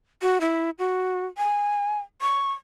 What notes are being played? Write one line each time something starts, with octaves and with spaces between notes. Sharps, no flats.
F#4
E4
F#4
G#5
C#6